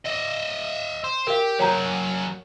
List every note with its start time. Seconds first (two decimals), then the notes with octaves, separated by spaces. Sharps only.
0.05 D#5 E5
1.04 C5
1.27 G4 A#4 F5
1.59 F#3 G#4 C#5 G5 A#5